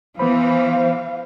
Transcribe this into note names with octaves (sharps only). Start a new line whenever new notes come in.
E3 B3 C5 F5 B5